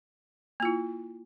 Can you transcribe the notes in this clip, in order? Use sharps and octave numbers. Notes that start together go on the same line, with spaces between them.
A#3 E4 F4